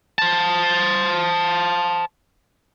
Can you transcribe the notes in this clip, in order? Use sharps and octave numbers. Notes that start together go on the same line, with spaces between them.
C5 A5